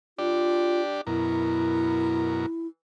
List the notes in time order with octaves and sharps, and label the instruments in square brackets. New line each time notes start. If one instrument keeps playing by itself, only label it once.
[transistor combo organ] D4 G4 D5 [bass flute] F4
[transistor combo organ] F#2 B2 A#4 [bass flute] E4